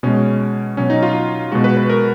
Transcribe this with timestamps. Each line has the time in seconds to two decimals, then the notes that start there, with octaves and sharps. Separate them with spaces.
0.03 B2 G#3 C#4
0.77 B2 F#3 C#4
0.90 D#4
1.03 F4
1.52 B2 G#3 F#4
1.64 B4
1.77 B4
1.90 A#4